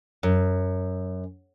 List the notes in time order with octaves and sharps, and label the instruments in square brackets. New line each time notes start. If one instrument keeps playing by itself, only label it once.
[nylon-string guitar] F#2